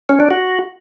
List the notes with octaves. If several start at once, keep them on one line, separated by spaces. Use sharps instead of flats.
C#4
D4
F#4